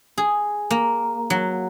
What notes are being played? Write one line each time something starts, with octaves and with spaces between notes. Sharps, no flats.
G#4
A#3
F#3